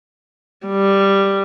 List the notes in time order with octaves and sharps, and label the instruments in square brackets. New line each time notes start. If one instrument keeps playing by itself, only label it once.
[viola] G3